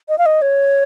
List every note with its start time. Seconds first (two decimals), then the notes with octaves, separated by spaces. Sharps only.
0.09 D#5
0.18 F5
0.26 D#5
0.42 C#5